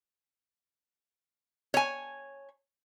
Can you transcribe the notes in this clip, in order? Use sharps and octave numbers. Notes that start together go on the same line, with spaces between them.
C#5 G#5